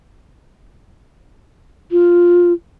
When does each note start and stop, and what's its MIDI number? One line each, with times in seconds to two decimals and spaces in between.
1.92 2.53 65